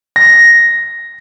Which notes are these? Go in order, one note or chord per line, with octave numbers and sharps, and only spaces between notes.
A#6